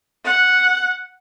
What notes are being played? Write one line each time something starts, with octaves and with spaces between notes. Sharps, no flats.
F#5